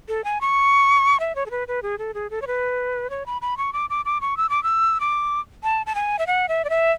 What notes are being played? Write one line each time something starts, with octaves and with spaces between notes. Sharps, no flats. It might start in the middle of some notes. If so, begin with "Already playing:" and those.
A4
G#5
C#6
E5
C#5
A4
B4
B4
G#4
A4
G#4
A4
C#5
B4
C#5
B5
B5
C#6
D6
D6
D6
C#6
E6
D6
E6
D6
A5
A5
G#5
E5
F#5
E5
D5
E5